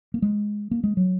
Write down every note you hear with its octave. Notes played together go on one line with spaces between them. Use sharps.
A#3
G#3
A#3
G#3
F#3